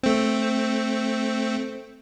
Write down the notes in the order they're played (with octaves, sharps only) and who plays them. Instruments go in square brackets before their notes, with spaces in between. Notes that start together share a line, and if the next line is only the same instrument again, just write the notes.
[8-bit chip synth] A3 C4